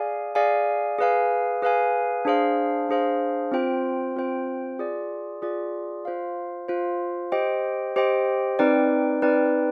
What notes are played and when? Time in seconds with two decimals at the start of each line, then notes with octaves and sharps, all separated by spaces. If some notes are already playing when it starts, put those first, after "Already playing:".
Already playing: G#4 D5 F5 G#5
0.35 G#4 D5 F5 G#5
0.98 G#4 B4 F5 G#5
1.62 G#4 B4 F5 G#5
2.25 D4 G#4 C5 F5
2.89 D4 G#4 C5 F5
3.52 C4 F4 C5 G5
4.16 C4 F4 C5 G5
4.79 F4 G#4 D5
5.42 F4 G#4 D5
6.05 F4 C5 F5
6.68 F4 C5 F5
7.32 G4 C5 D#5 G5
7.96 G4 C5 D#5 G5
8.59 C4 D#4 B4 D5 G5
9.22 C4 D#4 B4 D5 G5